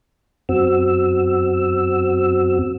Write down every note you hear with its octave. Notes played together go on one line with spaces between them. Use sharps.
F#2 C4 F#4 E6